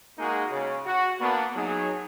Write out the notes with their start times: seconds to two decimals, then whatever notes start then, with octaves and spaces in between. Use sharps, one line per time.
0.18 G#3 A#3 D#4 F#4 G#4 A#4
0.51 C#3
0.86 F#4
1.21 A#3 B3 D4
1.56 F#3 D#4 G#4